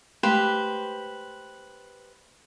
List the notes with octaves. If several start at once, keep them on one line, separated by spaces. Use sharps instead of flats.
G#3 A3 G4 B4 C5